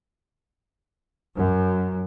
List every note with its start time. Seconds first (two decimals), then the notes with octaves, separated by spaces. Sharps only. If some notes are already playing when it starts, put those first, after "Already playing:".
1.36 F#2